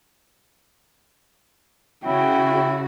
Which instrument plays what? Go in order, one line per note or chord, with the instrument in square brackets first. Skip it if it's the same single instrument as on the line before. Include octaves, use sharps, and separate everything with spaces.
[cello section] C#3 F#4 [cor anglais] E4 [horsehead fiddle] G5